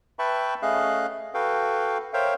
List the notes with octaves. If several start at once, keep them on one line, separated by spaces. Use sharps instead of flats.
B4 E5 G5 A5 B5 C#6
A3 C#4 G#4 D#5 F5 F#6
F#4 A4 B4 F5 G5
A#4 C5 C#5 E5 F5 G5